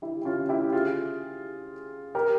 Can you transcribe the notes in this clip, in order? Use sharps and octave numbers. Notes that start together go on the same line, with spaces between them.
E4 G4
G4
C#4 F4
E4 G4
F4 G#4
G4 A#4